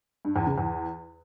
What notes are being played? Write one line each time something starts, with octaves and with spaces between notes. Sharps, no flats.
G2
E2
C#3
E2